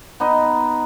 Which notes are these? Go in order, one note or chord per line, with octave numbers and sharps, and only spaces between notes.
B3 D#4 D#5